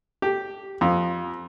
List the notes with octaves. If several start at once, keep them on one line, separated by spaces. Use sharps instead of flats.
G4
F2